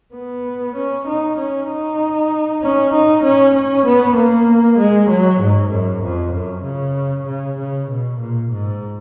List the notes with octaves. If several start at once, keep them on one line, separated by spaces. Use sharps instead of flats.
B3
C#4
D#4
C#4
D#4
C#4
D#4
C#4
C#4
B3
A#3
G#3
F#3
G#2
F#2
F2
F#2
C#3
C#3
C#3
B2
A#2
G#2